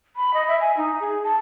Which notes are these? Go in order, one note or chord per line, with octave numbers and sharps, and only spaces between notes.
B5
D#5
E5
G#5
D#4
G#4
A5